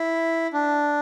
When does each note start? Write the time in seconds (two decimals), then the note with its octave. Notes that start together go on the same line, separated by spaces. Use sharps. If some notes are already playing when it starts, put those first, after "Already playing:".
Already playing: E4
0.53 D4